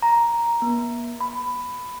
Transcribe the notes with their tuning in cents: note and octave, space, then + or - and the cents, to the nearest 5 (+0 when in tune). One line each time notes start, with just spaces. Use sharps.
A#5 +5
A#3 +45
B5 +10